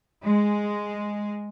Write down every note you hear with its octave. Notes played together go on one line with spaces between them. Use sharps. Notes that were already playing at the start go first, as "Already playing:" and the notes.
G#3